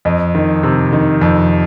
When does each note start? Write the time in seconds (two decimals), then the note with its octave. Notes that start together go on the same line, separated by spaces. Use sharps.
0.05 F2 D#5
0.35 D#3
0.63 C3
0.93 D#3
1.21 F2